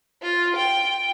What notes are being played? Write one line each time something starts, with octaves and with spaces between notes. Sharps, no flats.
F4
G5